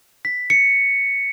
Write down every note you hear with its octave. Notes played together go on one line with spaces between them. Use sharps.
B6
C#7